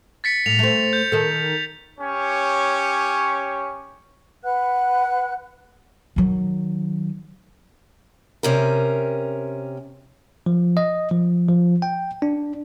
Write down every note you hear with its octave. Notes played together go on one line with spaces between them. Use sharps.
A6 B6 C#7
A2 F7
A3 C4
G6
D#3 A4
C#4 G4 C#5
B4 F#5 F#6
D#3 F#3
C3 C#4 A#4
F3
D#5
F3
F3
G5
D4